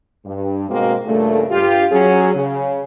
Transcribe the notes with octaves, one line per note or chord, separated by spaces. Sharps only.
G2
G#2 B2 G#3 A#3 C4 F#4
G2 A#2 C#3 A3
G2 F4 G4
F#3 C#4 G#4
C#3